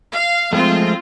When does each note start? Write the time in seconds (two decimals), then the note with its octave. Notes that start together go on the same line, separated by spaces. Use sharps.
0.11 F5
0.53 F3 G#3 A3 C4 F4